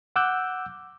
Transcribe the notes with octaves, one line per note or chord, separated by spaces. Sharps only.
F#5 D6 E6 F#6 G6